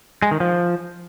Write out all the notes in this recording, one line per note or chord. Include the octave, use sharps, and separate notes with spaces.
G#3
D#3
F3